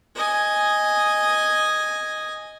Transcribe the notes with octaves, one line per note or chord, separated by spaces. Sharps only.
D#5 G#5